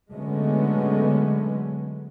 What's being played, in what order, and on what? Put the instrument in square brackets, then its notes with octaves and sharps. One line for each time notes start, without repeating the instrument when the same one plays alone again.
[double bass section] D3 F#3 G#3 A3 B3 C#4